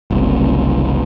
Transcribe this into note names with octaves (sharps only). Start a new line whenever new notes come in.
F#1 C2